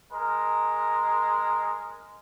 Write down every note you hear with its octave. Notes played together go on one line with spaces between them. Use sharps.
G#3 A#4